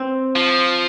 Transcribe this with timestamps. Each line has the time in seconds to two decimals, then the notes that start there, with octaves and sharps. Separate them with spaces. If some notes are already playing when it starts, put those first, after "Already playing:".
Already playing: C4
0.36 F3